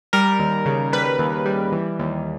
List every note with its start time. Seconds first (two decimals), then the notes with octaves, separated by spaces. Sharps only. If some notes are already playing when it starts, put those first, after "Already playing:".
0.13 G3 A#4
0.40 D#2
0.66 C#3
0.92 G3 B4
1.19 D#2
1.46 G3
1.72 E3
1.99 D#2